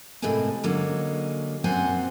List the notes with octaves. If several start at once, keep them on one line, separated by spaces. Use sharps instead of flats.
A2 C3 G#3 A#3 C4 G#5
D3 F#3 G#3 A#3 C#4
F#2 A#2 C4 C5 F#5 G#5